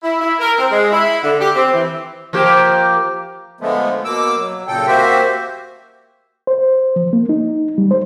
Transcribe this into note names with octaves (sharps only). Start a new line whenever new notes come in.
E4
E4
A#4
C4
G#3
E4
D3
G4
C4
E3
F3 A#3 G4
D3 F3 G#3 A3 B3
B2 A#3 D6 E6
F#3
A#2 C#3 A4 G5
A#3 C4 F#4 G4 C5 E5
C5
F3
A#3
D#4
G3
C5